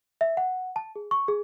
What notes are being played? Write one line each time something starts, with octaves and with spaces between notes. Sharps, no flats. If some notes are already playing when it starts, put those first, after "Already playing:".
E5
F#5
A5
G#4
C#6
G#4